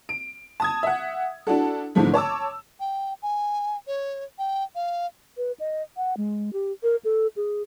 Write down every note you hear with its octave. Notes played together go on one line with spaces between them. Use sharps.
D7
A5 D#6 G#6
E5 F#5
D4 E4 F#4 A4
B1 G#2 D3 E3 F3 A3
C#5 A5 D6 E6
G5
G#5
C#5
G5
F5
B4
D#5
F#5
G#3
G4
A#4
A4
G#4